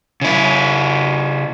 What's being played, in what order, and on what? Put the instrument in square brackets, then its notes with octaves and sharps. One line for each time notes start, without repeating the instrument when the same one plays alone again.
[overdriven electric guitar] C#3 E4